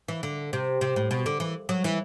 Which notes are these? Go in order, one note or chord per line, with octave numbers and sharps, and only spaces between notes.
E3
D3
C3
C3
A2
B2
D3
E3
F#3
E3